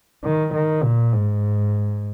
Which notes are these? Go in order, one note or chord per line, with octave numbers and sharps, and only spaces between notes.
D#3
D#3
A#2
G#2